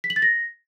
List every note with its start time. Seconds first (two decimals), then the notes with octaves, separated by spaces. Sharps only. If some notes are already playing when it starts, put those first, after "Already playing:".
0.04 B6
0.10 F#7
0.16 A6
0.22 A#6